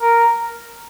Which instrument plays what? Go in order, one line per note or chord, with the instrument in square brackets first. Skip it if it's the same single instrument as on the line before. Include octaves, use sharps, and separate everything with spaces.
[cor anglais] A#4